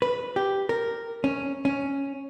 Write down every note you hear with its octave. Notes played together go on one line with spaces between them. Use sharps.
B4
G4
A#4
C#4
C#4